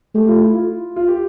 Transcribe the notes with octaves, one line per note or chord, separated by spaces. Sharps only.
A3 G4
F4
E4
F4
F4
G4